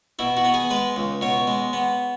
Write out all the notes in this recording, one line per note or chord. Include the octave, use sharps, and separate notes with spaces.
B2 E4
F#4
B3
G#4
G#3 B4
C#2
B2 C#5
G#3
B3